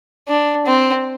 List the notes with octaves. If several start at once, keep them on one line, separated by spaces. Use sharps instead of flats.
D4
C4